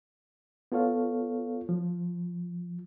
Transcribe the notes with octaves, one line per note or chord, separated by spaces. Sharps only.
B3 F4 A4 C#5 F5
F3